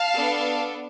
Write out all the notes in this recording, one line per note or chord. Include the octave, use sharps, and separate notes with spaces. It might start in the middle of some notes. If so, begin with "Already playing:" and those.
Already playing: F5 A5
B3 D4 A4